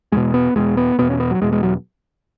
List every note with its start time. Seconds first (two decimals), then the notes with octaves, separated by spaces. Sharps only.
0.12 E2 B2 G#3
0.34 B3
0.55 E2 B2 G#3
0.77 B3
0.98 E2 B2 B3
1.10 C#4
1.20 B3
1.31 F#3
1.42 E2 B2 G#3
1.52 G#3
1.63 F#3